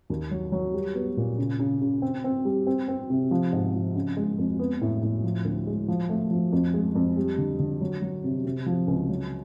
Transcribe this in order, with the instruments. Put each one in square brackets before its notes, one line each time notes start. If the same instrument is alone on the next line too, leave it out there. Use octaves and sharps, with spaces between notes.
[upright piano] D#2
F#3
F#3
G3
B3
A#2
C#3
C#3
C#3
C4
C4
G3
C4
C4
C3
F3
G#2
F3
C#3
G#3
F2
B3
A2
A2
F3
D2
G#3
F3
A3
F3
F2
G#3
F2
G3
D3
D3
F#3
F#3
C3
C3
F3
C#2
F#3